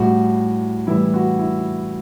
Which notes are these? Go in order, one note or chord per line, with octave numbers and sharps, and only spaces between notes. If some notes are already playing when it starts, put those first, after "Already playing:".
Already playing: A2 G3 F#4
A2 E3 G3 E4
F#4
E4